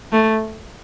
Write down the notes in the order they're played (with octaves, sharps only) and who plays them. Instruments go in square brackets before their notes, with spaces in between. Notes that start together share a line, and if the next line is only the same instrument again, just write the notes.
[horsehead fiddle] A3